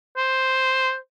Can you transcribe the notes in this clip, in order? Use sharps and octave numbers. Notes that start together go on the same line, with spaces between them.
C5